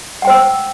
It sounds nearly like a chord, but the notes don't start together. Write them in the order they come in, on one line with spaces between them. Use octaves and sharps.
F#5 G5 C5 E6